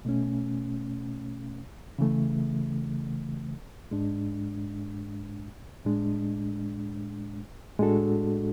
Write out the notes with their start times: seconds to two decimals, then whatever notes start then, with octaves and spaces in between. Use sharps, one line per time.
0.05 B2 A3 C#4
1.99 C#3 E3 A3
3.91 G#2 G#3 D4
5.85 A2 G#3 D4
7.79 A2 G#3 D4 F#4 A4